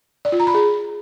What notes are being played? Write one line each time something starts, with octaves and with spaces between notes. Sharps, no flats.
D5
F4
A#5
B5
G#4